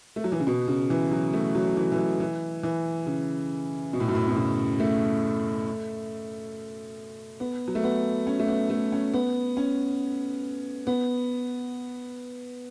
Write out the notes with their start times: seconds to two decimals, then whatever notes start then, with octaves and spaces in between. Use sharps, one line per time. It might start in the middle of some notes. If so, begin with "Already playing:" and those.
0.16 A3
0.24 F#3
0.32 E3
0.40 C#3
0.47 B2
0.68 C#3
0.90 E3
1.11 F#3
1.33 A3
1.55 F#3
1.77 E3
1.92 E3
1.98 F#3
2.20 E3
2.63 E3
3.07 C#3
3.93 B2
4.00 A2
4.08 F#2
4.15 A2
4.28 B2
4.36 C#3
4.80 A3
7.40 B3
7.68 F#3
7.75 A3
7.83 B3
8.27 C#4
8.40 A3
8.48 B3
8.70 A3
8.92 C#4
9.14 B3
9.57 C#4
10.87 B3